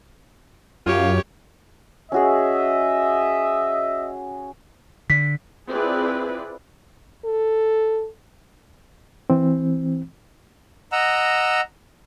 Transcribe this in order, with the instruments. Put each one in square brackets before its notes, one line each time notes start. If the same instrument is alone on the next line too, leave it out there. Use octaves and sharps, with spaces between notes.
[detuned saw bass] F#2 [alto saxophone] F4 [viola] G4 C#5 [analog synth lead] F5
[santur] C#4 F#4 G#4 [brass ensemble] D#5 E5
[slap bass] D3 [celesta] B6
[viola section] C4 E4 F4 G#4 B4 D5
[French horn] A4
[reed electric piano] E3 C4
[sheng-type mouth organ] D#5 F#5 A#5 E6